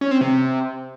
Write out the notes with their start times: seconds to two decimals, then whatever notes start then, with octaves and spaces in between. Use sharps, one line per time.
0.01 C#4
0.11 C4
0.21 C3